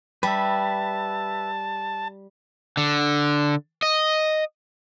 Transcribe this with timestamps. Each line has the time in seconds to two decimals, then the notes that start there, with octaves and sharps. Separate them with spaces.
0.23 G3 B4 E5 A5
2.77 D3
3.82 D#5